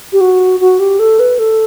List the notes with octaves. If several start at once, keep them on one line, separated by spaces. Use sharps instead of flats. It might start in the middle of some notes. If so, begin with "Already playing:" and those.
G4
F#4
F#4
G4
A4
B4
A4